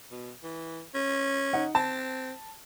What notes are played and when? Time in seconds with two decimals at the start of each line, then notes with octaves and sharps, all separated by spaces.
0.11 B2
0.43 E3
0.95 C#4
1.53 D#4 F#5
1.75 C4 A5